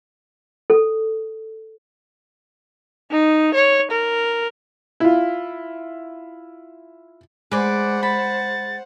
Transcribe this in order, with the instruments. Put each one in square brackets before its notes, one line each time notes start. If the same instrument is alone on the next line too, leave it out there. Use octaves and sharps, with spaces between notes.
[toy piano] A4
[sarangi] D#4
C#5
A#4
[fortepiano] E4 F4
[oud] G#3 [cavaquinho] B4 D5 [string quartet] C5 F#5
[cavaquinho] B5 [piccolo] A6